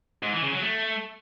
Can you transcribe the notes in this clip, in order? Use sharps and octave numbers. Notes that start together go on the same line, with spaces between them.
G#2
E3
C#3
F#3
A3